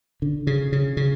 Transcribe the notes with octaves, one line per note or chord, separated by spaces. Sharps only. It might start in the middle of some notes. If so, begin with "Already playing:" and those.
D3
C#3
C#3
C#3